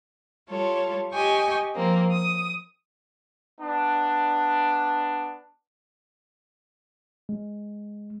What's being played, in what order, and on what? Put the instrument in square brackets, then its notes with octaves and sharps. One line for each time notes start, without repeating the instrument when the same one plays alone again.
[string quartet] G3 F4 A4 C#5
G4 D#5 G5 G#5 C#6
F3 A#3 C4
D#6
[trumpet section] B3 D4
[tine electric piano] G#3